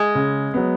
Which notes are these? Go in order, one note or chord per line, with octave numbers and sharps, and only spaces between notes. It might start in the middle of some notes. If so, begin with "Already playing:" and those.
Already playing: G#3
C#3
F#3 B3